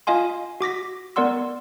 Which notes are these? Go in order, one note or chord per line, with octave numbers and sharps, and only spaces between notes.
F4 D#5 F5 G#5 C6
F#4 D6 A#6 B6
B3 A#4 D5 F#5 C6 E6